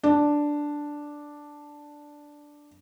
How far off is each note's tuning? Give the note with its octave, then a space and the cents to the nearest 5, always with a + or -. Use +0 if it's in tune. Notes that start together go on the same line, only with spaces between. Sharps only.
D4 +0